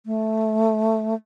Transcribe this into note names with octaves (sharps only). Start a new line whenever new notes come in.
A3